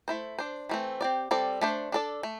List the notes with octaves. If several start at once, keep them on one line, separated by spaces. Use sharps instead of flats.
A3 E4 C5
D4 C5
E3 A3 C4
C4 G4 D5
G3 C4 A4 D5
A3 D4 C5
D4 A4 D5
A3